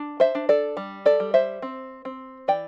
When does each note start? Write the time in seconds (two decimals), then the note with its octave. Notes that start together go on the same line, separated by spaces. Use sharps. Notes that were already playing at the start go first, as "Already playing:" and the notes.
Already playing: D4
0.20 C5 E5
0.35 D4
0.49 A4 D5
0.77 G3
1.06 A4 D5
1.20 G3
1.34 C5 E5
1.62 C4
2.05 C4
2.48 E3 D5 G5